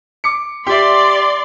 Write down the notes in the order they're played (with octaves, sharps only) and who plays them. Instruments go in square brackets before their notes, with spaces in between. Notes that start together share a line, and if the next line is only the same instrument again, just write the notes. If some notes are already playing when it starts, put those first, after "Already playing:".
[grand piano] D6 C#7
[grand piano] G4 E5 [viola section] D5 C6